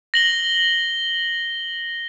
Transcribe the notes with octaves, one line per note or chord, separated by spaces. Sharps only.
A#6 F#7 G7